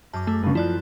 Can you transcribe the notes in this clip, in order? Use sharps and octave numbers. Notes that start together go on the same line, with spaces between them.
F#2 A5 D6
A3 A4 A5
G2 C#3 B3
F3 E4 D5 F#6